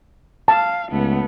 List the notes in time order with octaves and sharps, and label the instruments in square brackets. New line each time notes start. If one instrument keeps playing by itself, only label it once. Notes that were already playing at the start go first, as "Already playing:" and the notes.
[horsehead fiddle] F5 [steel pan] A5
[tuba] C#2 [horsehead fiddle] A3 B3